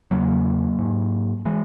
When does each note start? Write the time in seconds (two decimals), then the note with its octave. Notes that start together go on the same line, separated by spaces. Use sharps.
0.11 E2 C#3 F#3 A#3
0.79 G#2
1.45 E3 G#3